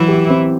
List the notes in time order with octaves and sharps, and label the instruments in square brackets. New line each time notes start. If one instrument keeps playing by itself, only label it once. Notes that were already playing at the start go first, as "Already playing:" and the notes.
Already playing: [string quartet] E3 E4 [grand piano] F#3
[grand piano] G4
C4